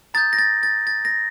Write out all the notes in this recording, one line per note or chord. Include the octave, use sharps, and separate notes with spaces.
A#5 D#6 G6 A6
A#6
A6
A6
A6
A#6